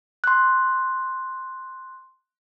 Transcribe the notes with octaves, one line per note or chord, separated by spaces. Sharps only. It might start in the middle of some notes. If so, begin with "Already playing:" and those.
C6 F#6